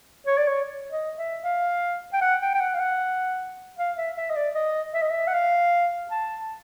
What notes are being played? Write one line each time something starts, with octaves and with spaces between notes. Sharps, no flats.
C#5
D5
C#5
D#5
E5
F5
G5
F#5
G5
G5
F#5
F5
F#5
F5
E5
E5
D#5
D5
D#5
E5
D#5
E5
F#5
F5
A5